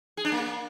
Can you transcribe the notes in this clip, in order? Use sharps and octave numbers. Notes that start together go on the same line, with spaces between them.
G#4
D4
A#3